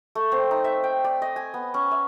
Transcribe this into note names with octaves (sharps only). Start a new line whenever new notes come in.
A3
C4
D#4
E5
G5
D5
D#5
G#5
B3
C#4
E5